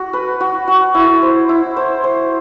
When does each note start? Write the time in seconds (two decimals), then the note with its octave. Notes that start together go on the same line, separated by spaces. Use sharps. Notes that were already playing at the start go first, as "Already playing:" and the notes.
Already playing: F#4
0.13 B4
0.40 F#4
0.68 F#4
0.94 E4
1.22 C5
1.49 E4
1.76 C5
2.04 C5